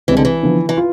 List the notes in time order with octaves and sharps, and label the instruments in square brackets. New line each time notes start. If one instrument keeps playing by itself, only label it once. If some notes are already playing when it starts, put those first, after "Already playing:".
[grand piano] C2 C3 G#3 C4 [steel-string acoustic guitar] E3
[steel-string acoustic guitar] D3
E3
[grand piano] D3 F3 B3
[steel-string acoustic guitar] E3
[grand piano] F4